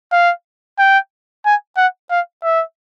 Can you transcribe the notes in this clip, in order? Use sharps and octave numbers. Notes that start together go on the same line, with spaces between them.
F5
G5
G#5
F#5
F5
E5